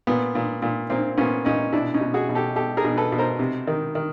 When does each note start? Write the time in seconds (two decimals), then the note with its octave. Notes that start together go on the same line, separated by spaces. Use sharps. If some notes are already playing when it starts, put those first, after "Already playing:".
0.07 A#2 B3
0.35 A#2
0.62 A#2
0.90 A#2 A#3 C4
1.18 A#2 B3 C#4
1.45 A#2 C#4 D#4
1.73 B2 D4 E4
1.94 C#4 D#4
2.01 B2
2.14 F#4 G#4
2.29 B2
2.35 G4 A4
2.56 B2 G4 A4
2.77 G#4 A#4
2.84 B2
2.97 A4 B4
3.12 B2
3.18 A#4 C5
3.39 C3
3.67 D#3
3.95 D#3